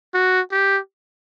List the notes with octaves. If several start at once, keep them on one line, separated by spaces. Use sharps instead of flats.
F#4
G4